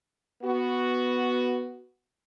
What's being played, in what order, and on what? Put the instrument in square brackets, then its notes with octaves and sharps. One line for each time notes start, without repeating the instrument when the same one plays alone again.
[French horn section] B3 F#4